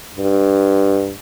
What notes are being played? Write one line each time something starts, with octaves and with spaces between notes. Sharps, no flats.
G2